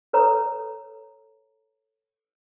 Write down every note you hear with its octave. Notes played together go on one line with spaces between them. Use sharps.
A4 B4 C#5 A#5